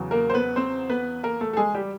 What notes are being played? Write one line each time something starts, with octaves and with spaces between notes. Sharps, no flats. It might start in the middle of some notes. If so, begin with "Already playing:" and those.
Already playing: E2 C#3 F#3
A#3 A#4
C5
B3 B4
C4 C5
B3 B4
A#3 A#4
A3 A4
A4
G#3 G#4
G3 G4